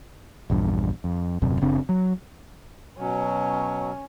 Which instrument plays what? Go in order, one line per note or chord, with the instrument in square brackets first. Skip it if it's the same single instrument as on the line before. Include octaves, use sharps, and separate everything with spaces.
[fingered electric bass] A#1 E2 G2
F2
D#1 F#2 C3
F#1 C#3 C4 D4
F#3
[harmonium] B2 F#3 [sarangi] C#4